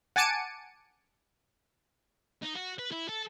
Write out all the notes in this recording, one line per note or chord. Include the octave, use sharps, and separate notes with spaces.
F#5 G#5 A5 D6 C#7 D#7
D#4
F#4
B4
E4
A4